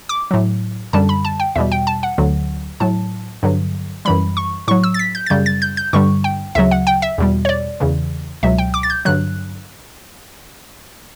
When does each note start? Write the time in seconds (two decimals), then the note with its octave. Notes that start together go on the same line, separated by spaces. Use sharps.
0.09 D6
0.31 A2 F#3
0.93 F#2 D3 G3 A5
1.09 B5
1.25 A5
1.40 G5
1.56 E2 B2 G3 E5
1.72 G5
1.87 A5
2.03 F#5
2.18 D2 D3 F#3
2.80 A2 F#3 A5
3.43 G2 D3 F#3
4.05 F#2 E3 G3 B5
4.37 C#6
4.68 A2 F#3 C#6
4.83 E6
4.94 A6
4.99 B6
5.15 G6
5.26 A6
5.30 F#2 C#3 G3 G6
5.46 A6
5.62 G6
5.77 G6
5.93 G2 D3 G3 C#6
6.24 G5
6.55 D2 C#3 F#3 E5
6.71 F#5
6.87 G5
7.02 E5
7.18 E2 B2 G3
7.45 C#5
7.49 D5
7.80 E2 C#3 E3
8.43 C#2 B2 F#3 E5
8.58 G5
8.74 D6
8.83 A6
8.90 G6
9.05 G2 D3 F#3 F#6